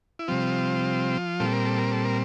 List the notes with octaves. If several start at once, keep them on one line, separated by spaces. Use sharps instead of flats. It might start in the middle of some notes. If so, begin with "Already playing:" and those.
E4
C3 F3 G3 C4 F4
A#2 G3 C4 A4
A#4
A4
A#4
A4
A#4